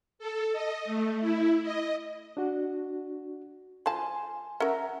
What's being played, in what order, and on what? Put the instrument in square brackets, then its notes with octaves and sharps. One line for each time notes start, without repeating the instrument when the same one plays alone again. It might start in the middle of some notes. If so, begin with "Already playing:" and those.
[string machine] A4
D#5
A3
E4
D#5
[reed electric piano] D4 F#4
[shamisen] F3 A5 [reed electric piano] G#5 C6
[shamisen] C#4 A#4 [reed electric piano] E5 F#5 A#5